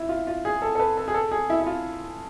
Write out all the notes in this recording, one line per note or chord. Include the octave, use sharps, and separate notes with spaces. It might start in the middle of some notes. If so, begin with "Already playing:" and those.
Already playing: E4
F4
F4
G#4
A4
A4
B4
A4
G#4
A4
G#4
E4
E4
F4